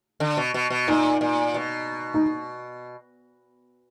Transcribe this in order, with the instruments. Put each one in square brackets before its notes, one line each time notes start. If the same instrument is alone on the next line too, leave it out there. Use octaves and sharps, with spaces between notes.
[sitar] D3
B2
B2
B2
[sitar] A#2 [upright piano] D#4
[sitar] A#2
B2
[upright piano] D#4